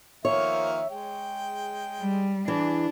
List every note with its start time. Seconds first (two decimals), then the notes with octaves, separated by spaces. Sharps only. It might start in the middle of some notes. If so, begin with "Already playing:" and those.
0.25 D#3 F3 A#3 C#5 E5
0.91 G#3 G#4 G5
2.00 G3
2.48 E3 D4 G#4